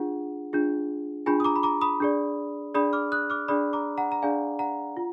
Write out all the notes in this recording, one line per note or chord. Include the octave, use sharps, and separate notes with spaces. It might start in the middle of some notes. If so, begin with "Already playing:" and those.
Already playing: D4 F4 G#4 F#5
D4 F4 G#4
D4 F4 G#4 G#5 B5
D#6
A#5 D6
B5
A#5 D6
B5 D#6
D4 G#4 D5
D4 G#4 D5 B5 D#6
D6 F6
D#6 F#6
D6 F6
D4 G#4 D5 B5 D#6
A#5 D6
F#5 A#5
A#5
D4 G#4 D5 F5 G#5
F#5 A#5
F4